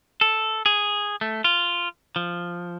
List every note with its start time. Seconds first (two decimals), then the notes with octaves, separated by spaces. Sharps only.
0.21 A4
0.66 G#4
1.21 A3
1.44 F4
2.16 F3